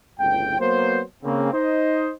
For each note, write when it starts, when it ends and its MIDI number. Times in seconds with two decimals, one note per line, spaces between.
0.19 0.56 31
0.19 0.56 37
0.19 0.56 45
0.19 0.56 79
0.59 1.01 54
0.59 1.01 58
0.59 1.01 59
0.59 1.01 72
1.23 1.49 49
1.23 1.49 58
1.23 1.49 60
1.53 2.10 63
1.53 2.10 72
1.53 2.10 75